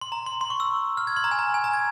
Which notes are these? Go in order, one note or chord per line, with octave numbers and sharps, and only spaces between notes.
C6
A#5
C6
C6
C#6
E6
F6
G#6
C6
A#5
G#5
A#5
G#5
A#5
G#6